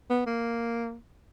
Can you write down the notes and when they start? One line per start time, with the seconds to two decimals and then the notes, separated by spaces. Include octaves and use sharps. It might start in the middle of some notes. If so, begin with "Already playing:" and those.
0.10 B3
0.26 A#3